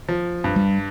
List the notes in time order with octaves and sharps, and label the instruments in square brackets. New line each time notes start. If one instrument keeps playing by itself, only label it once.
[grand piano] F3
G2
[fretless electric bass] G3